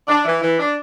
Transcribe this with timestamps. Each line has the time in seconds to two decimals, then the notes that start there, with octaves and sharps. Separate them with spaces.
0.08 D4
0.25 E3
0.42 E3
0.59 D4